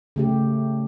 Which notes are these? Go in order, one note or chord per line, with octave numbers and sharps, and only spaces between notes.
C#3 A3 G4